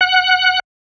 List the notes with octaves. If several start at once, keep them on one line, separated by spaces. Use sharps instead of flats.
F#5 F#6